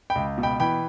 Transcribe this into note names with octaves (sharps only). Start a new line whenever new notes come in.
G5 B5
C#2
B2
G5 B5
E3 G5 B5